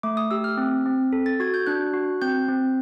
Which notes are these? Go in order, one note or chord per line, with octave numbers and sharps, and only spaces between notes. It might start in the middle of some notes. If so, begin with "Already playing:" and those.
A3 D6
D#6
G4 E6
F6
C4
C4
A4
A6
F#4 G#6
G6
D4 F#6
F#4
C4 G6
C4